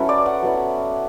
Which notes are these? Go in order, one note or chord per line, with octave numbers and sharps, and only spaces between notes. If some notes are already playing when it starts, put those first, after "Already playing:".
Already playing: F#3 C#4 E4 A4 B4
D5
F#5
F#3 B3 E4